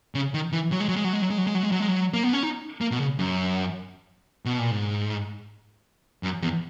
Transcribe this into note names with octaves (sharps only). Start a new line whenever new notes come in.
C#3
D#3
E3
F#3
G#3
F#3
G#3
F#3
G#3
F#3
G#3
F#3
G#3
F#3
G#3
F#3
G#3
F#3
A#3
B3
C#4
D#4
A#3
B2
C#3
F#2
B2
A#2
G#2
F#2
E2